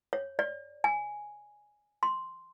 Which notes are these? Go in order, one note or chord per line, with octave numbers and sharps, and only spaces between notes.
C#5
D5
G#5
C6